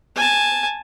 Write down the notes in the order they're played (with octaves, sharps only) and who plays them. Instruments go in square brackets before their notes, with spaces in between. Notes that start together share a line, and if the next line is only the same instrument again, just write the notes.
[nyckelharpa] G#5 A5